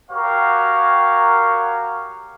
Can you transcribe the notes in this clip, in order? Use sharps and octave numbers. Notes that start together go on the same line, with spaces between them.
F#4 G4 A#4 C#5 F5